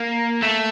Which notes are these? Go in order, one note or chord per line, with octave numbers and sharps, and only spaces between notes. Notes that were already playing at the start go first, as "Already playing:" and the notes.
Already playing: A#3
A3